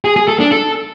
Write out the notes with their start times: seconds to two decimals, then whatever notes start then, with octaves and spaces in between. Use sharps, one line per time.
0.05 G#4
0.16 G#4
0.28 A4
0.40 D4
0.52 A4